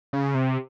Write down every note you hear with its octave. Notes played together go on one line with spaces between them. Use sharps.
C#3
C3